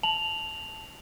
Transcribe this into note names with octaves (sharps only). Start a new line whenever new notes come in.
A5 F7 F#7